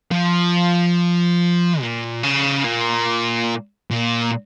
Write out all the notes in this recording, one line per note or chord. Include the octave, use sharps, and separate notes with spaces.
F3
A#2
C#3
A#2
A#2